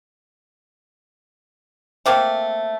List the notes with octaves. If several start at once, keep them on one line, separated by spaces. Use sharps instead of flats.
A3 A#3 C4